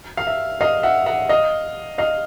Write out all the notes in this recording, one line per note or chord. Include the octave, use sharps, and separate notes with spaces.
F5
E5
D#5 F5
E5 F#5
E5 F#5
D#5 F5
D#5 F5